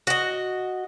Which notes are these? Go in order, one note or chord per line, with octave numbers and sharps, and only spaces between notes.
F#4 D#5